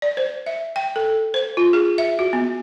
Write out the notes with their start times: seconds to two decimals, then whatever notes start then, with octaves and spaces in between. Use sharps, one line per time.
0.02 D5
0.17 C5
0.46 E5
0.76 G5
0.96 A4
1.34 C5
1.57 F4
1.73 G#4
1.98 E5
2.19 F#4
2.33 B3